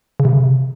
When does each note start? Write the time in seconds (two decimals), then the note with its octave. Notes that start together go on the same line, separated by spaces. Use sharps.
0.20 C#3
0.25 C3